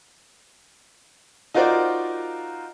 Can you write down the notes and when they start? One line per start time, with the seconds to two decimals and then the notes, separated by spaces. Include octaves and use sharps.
1.54 D#4 F4 F#4 A#4 C5 D5